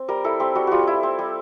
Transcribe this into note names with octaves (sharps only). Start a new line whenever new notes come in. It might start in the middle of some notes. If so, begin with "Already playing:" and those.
Already playing: C4
G3 A#4
E4 A4
C4 G4
G3 F#4
G3 F4 F#4
E4
C4
G3